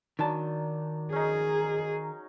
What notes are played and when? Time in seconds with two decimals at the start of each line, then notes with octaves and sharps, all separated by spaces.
0.19 D#3 F#3 D4 A5
1.12 C#4 D#4 G#4